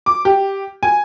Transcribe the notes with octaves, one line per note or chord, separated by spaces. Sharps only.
D6
G4
G#5